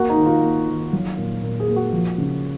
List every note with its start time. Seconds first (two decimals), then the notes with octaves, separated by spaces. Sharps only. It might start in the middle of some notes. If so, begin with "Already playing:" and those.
Already playing: A#3 F#4
0.09 D#4
0.18 D#3
0.26 F4
0.42 A#3
0.68 D#3
0.93 F#3
1.18 A#2
1.43 A#2
1.60 G#4
1.68 A#3
1.76 F#4
1.93 F3
2.18 C#3